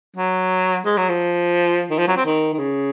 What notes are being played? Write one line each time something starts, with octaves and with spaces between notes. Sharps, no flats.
F#3
G#3
F#3
F3
D#3
F3
F#3
C4
D#3
D#3
C#3